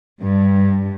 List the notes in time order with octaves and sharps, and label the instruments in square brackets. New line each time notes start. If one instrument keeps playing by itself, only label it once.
[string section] G2